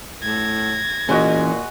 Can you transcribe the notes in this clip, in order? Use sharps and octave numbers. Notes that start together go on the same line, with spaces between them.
A2 G#6 A#6
A#2 E3 G#3 C#4 F#4 D#5